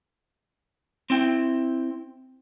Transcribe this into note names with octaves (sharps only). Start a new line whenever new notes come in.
C4 E4 G5